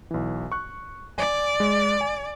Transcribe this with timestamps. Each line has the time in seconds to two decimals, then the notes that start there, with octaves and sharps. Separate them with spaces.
0.11 B1 E3
0.52 C#6 F#6
1.18 D5 G#5
1.60 G#3
2.01 G#5